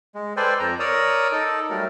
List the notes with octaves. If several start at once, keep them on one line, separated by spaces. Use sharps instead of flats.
G#3
A4 B4 C5 D5 G5 G#5
F2 A#5
A#4 C#5 D5 A#5 D#6 E6
D#4 A4 A5
F#3 G3 A3 A#4